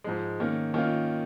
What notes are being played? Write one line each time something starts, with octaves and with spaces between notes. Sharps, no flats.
G#2 F3 G#3
D#3 A#3 C#4
D#3 A#3 C#4 F4